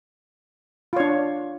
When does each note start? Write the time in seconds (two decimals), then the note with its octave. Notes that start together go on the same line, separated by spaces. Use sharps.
0.93 F4
0.96 C#5
1.00 D4